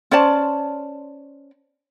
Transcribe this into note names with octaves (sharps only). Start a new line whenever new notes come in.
C#4 C5 D5 A5